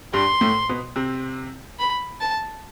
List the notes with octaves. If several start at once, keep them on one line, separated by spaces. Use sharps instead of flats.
G2 G3 C6
A2 A3
B2 B3
C3 C4
B5
A5